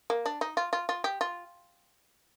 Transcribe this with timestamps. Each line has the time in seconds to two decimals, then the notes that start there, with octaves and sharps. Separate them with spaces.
0.10 A#3
0.26 D4
0.41 D#4
0.57 F4
0.73 F4
0.89 F4
1.04 G4
1.21 F4